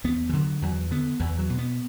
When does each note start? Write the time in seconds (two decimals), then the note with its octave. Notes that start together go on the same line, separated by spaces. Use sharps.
0.04 E2 B3
0.29 E3
0.33 D3 F#3
0.62 E2 F#3
0.91 D3 B3
1.20 E2 E3
1.39 F#3
1.50 B2
1.59 B3